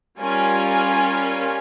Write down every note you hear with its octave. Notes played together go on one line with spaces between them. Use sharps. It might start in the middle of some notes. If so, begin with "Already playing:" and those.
G3 C#4 F4 A#4 G#5